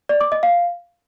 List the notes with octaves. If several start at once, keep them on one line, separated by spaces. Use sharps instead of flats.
D5
D6
D#5
F5